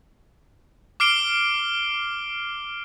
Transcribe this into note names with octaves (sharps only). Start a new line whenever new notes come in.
D6 F6 C7 D7 G7